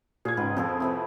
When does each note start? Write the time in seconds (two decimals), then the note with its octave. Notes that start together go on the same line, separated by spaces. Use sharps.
0.25 A#2 G#4 G#6
0.37 G#2 C#3 B4 G5
0.57 F2 F3 G#4 A4
0.80 A2 C3 B4